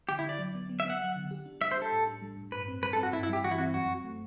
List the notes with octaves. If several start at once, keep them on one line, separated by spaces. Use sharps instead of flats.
D3 G4
E4
D3 D5
F#3
B3
B3
E5
B3 F#5
F#3
D3
G4
D4
G3 E5
C5
G4 A4
A2
D4
G3
A2
G2 B4
C4
G3 B4
A4
C4 F#4
G2 E4
E4
G3 G4
E3 F#4
E4
C4 F#4
F#2 F#4
F#2
A3